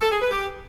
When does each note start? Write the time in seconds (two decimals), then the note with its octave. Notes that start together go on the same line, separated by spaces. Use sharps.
0.02 A4
0.11 G#4
0.21 B4
0.31 G4